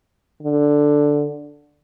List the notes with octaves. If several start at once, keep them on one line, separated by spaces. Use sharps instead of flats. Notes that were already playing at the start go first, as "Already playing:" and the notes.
D3